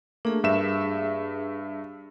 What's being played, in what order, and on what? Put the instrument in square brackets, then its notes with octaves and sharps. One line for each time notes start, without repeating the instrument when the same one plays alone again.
[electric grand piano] A3 A#3 [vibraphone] D4 G#4
[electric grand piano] G2 E5 E7